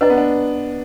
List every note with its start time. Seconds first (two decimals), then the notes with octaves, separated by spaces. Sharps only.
0.01 D4 B4 D#5 A#5
0.10 B3
0.18 D4